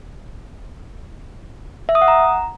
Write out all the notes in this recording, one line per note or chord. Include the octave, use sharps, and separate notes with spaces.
E5
D#6
F#5
A#5